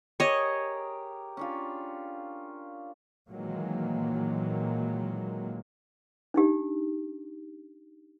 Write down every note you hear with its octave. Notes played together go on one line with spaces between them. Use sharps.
G4 G#4 A#4 C#5 D#5
C#4 D4 F4
A#2 D#3 E3 F#3 G#3 A#3
D4 D#4 G4